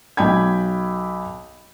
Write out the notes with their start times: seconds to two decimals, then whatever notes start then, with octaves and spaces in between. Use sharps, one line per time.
0.17 B1 G5 B5 G#6